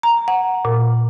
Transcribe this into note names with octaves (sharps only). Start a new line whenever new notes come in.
A#5
F#5
A#2